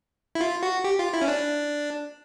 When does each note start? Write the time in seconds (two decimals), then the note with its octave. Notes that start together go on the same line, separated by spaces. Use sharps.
0.35 E4
0.41 F4
0.63 F#4
0.84 G4
0.99 F4
1.14 E4
1.21 C#4
1.28 D4